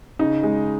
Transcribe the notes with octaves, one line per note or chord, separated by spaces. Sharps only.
C#3 D#4
G#3